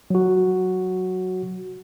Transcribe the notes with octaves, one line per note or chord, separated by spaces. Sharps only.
F#3 F#4